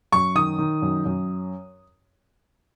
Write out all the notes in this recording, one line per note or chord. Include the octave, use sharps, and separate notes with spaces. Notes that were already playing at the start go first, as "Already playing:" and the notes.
F#2 C#6
D#3 D#6
D#3
F#2
F#2